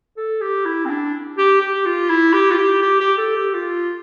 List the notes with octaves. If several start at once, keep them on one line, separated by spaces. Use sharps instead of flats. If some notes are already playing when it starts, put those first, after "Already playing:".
A4
G4
E4
C4
D4
G4
G4
F4
E4
G4
F4
G4
G4
G4
A4
G4
F4